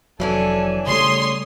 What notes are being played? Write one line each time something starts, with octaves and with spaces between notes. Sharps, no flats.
F1 E3 F#3 C#4 D4 A4 G#5
C#3 G3 A3 C#5 C6 D#6